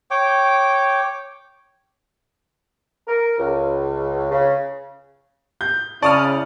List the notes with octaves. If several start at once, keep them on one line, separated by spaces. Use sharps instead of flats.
C#5 G5 D6
A#4
C#2
C#3
G6
C#3 E4 D5 A5 C#6 D#6 F6